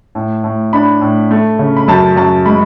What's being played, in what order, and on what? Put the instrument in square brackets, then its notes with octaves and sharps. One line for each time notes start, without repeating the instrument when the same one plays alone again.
[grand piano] A2
A2
D4 B5
A2
A3
C#3
B5
F#2 A5
F#2 A5
G#3 B5